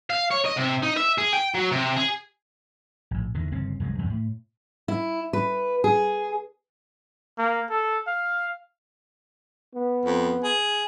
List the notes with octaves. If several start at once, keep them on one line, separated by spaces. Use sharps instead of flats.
F5
C#5
D#5
C3
D#4
E5
G#4
G5
F#3
C3
G#4
A#1 A2
E2 D3 D#3
G1 C#3 C4
C2 F#2 F#3 G#3
E2 G2 C3
A2
E4
B4
G#4
A#3
A4
F5
B3
F2
G#4